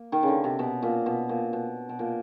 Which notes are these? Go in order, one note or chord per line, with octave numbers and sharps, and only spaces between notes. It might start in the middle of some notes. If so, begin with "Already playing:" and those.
Already playing: A#3
D#3
C#3
D3
C3
B2
A#2
B2
A#2
B2
B2
A#2